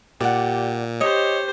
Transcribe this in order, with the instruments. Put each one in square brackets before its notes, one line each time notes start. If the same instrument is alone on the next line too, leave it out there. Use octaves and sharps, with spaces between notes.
[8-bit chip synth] A#2 [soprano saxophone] G4 [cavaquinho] D5 F#5
[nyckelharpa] G4 C5 [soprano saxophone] C#5 [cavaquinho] D#5